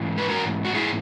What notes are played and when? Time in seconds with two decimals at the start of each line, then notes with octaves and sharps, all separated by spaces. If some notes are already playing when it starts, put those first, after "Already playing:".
Already playing: G#2 E3
0.18 B4
0.29 F#4 A#4
0.65 F#4
0.74 E4 G#4